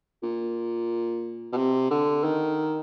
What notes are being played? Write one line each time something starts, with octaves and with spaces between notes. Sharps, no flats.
A#2
B2
C3
D3
D#3